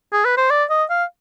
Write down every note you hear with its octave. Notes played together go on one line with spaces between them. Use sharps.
G#4
B4
C5
D5
D#5
F5